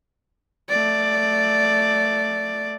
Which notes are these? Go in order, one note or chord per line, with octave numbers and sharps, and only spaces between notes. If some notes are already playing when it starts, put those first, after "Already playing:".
A3 D5